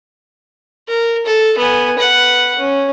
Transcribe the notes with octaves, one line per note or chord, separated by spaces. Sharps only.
A#4
A4
B3 G#5
B4 F#5
C#4